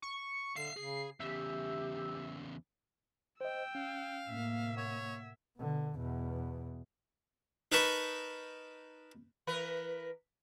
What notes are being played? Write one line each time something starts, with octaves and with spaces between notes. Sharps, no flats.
C#6
D3 E5 F5 C7
C#3 G#4
E2 C#3 G4 E5
C5 D#5 G5 E6
C#4 F5
A2 C3 A#3 E5
C#5 F#5 G#6
B2 D3
E2 B2
D#4 A#4 B4 A5 B5 C#6
E3 A#4 B4